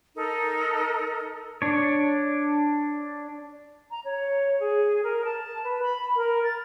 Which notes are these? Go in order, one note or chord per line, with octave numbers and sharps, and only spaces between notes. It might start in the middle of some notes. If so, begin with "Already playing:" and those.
D#4 A4 A#4
D4 C#5
A#5
C#5
G#4
A#4
A5
B4
B5
A#4
A6